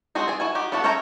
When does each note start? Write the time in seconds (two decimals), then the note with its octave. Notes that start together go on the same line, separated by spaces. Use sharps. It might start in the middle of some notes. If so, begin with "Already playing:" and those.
0.15 G#3 C4 F#4 G#4
0.28 G#4 D5 G#5
0.40 E4 F#4 G#5
0.55 D#4 F#4 G4
0.72 B3 E4 F#4 A4 F#5
0.84 C#4 C#5 E5 G5 A#5